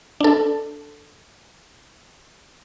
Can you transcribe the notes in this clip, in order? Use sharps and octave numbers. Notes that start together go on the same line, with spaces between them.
D4 A4